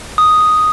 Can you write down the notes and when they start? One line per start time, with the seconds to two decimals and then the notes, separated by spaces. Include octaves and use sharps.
0.18 D#6